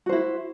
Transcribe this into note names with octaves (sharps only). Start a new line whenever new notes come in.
E4 F#4 C5